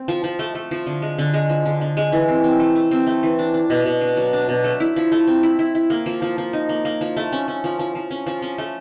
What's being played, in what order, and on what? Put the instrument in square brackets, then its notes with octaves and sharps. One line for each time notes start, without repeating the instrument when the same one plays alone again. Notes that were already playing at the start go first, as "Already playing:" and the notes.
Already playing: [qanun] C4
F3
F3
A3
A3
F3
D3
G#3
D3
G#3
F3
D3
D3
G#3
E3
C4
C4
A3
A3
C4
A3
E3
D4
D4
B2
B2
D4
F#3
D4
B2
A3
E4
F3
A3
C4
E4
E4
E4
A#3
F3
F3
F3
D#4
A#3
A#3
F3
A3
C#4
C#4
F3
F3
F3
C#4
F3
C#4
A3